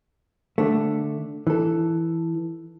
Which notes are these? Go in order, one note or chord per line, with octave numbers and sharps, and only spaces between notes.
D3 A3
E3 A4